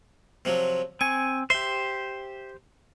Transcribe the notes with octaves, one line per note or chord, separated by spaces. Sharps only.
C3 F3 F#3
C4 G#5 C#6
G4 C5 E5 C6